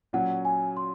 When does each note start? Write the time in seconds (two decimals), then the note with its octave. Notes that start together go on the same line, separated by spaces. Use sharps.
0.13 A#2 F#3 C#4 F#5
0.45 G#5
0.77 C6